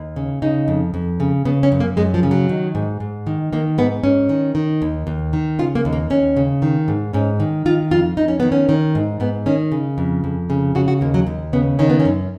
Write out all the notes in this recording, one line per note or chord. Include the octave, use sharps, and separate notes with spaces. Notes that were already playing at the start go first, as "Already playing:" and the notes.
Already playing: D#2
C#3
C#3 D#4
F2
F2
C#3
C#3 B3
C#4
F#2
A#3
F#2 G#3
F3
C#3
F#3
D#3
G#2
G#2
D#3
D#3 A#3
G#2 B3
G#2 C#4
D#3
D#3
D#2
D#2
D#3
C#3 F4
A#3
D#2
A#3
D#2 C#4
C#3
D#3
G#2
G#2 C#4
D#3
D#3 F4
F2 F4
F2 D#4
C#4
D#3 B3
C#4
D#3
G#2
G#2 B3
D#3 C#4
C#3
F2
F2
C#3
C#3 F#4
F#4
D#2 A#3
F#3
D#2
C#3 B3
D#3 C#4
B3
C#4
F#2